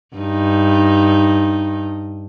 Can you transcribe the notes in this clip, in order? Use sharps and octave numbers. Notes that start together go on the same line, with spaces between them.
G2 D#4